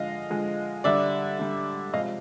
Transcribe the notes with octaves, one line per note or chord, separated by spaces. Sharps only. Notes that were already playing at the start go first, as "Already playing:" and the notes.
Already playing: D3 F3 G#3 D#5 F5
D3 F3 G#3
D3 G3 D5 E5
D3 G3
C3 F3 G#3 D#5 F5